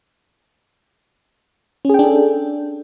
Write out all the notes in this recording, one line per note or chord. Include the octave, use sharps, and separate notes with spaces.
C#4 D4 G#4 A4 G5